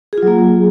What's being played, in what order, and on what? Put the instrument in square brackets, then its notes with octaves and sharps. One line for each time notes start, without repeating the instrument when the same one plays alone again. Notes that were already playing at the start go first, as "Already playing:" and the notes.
[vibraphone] G#4
F4
F#3
A#3